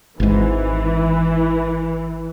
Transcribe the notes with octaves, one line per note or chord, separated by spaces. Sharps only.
G#1 G#2 E3